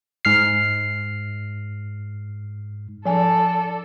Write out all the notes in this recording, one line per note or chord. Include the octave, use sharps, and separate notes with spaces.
G#2 F6 C7
F3 D4 A4 G#5